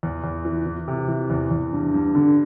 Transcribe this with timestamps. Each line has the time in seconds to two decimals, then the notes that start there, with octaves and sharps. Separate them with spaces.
0.03 E2
0.24 E2
0.45 E3
0.66 E3
0.88 C3
1.08 E3
1.30 E2
1.51 E2
1.73 G2
1.94 G2
2.15 D3